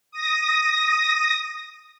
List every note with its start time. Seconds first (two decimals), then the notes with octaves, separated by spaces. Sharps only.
0.12 D#6 A#6